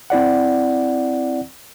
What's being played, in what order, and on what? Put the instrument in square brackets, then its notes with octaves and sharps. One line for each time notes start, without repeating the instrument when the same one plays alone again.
[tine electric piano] C4 E4 D5 F#5